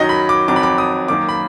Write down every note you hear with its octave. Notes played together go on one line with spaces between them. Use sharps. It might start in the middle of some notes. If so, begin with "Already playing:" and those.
Already playing: F#2 D#3 F#3 D#5
B5
D6
F2 D#3 F#3 D6
B5
D6
D#6
F#2 D#3 A#3 D6
B5